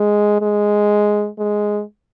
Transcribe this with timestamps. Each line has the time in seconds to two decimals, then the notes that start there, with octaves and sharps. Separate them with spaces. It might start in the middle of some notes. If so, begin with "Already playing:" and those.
Already playing: G#3
0.41 G#3
1.39 G#3